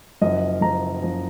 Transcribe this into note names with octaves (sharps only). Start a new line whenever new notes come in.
F#1 F#2 F3 D#5
F#1 F#2 F3 A#5
F#1 F#2 F3